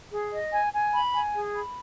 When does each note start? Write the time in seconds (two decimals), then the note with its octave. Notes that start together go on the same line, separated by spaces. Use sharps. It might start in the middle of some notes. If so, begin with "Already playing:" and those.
0.12 G#4
0.33 D#5
0.53 G#5
0.73 G#5
0.94 B5
1.14 G#5
1.34 G#4
1.55 B5